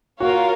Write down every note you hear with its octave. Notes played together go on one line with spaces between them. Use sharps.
A#3 F4 F#4 A#4 C#5 F5